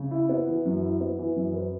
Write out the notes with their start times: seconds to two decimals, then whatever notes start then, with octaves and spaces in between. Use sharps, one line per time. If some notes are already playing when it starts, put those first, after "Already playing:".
Already playing: C#3
0.11 E4
0.29 B3
0.48 E3
0.65 F#2
0.83 E4
1.01 B3
1.19 E3
1.36 F#2
1.54 B4